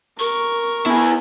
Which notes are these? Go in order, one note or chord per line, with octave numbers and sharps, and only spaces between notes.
A#4 C#6
B3 E4 G#4 B5